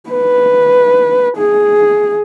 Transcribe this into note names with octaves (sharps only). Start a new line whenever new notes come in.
B4
G#4